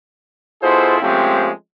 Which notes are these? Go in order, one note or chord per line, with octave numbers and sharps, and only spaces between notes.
B2 E4 F4 G#4 A4 C5
F3 G#3 A3 C4 C#4 G4